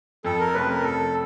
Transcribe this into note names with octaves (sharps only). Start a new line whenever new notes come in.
F2 A4
A#4
C3 F3 A3 C#4 B4
A#4
F2 A4